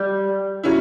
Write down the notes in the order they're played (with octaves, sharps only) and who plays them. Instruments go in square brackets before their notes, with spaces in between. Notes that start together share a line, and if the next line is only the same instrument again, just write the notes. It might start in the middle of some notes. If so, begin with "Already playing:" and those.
Already playing: [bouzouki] G3
[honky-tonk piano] F#3 C#4 E4